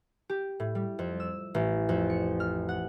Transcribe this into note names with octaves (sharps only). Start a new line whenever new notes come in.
G4
A2
G3
F2
E6
A1
F2
C#7
F6
F#5